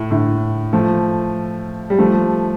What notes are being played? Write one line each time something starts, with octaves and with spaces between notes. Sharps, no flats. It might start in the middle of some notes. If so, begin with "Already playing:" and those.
Already playing: A2
A2 D3
F3 A3
G3
F3 A3